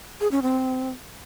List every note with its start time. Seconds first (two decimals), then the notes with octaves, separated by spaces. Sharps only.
0.21 G#4
0.31 C#4
0.42 C4